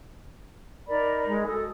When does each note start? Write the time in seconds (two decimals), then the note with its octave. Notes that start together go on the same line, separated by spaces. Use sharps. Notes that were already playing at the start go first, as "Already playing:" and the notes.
0.88 D#4 A#4 D5 B5
1.26 G#3
1.46 F#4 A4 D#6